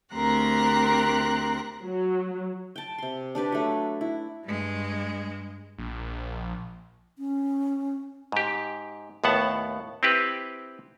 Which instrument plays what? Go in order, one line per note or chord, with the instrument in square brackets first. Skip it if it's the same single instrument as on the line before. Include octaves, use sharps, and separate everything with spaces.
[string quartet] D2 C4 G4 A#4 A#5 F#6
[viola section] F#3
[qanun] G5 A5
C3 C6
D4 G4 B4 A5
F#3 A3
E4
[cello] G2 G#3
[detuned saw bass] A#1
[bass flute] C#4
[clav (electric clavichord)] G#2 G4
D#2 A2 B3 F#5 A5
C4 E4 G4 B4